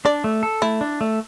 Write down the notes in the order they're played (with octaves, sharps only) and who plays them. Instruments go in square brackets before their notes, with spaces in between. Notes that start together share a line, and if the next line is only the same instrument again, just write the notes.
[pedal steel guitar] D4 [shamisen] D5
[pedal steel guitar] A3
A4
[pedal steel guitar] A3 [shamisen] E4
[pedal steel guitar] D4
A3